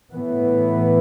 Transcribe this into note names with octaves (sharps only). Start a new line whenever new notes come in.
A2 E3 B3